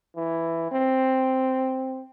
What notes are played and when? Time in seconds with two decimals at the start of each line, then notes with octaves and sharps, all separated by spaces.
0.16 E3
0.71 C4